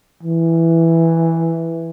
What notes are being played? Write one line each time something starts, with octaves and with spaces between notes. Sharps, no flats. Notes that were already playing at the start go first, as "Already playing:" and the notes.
E3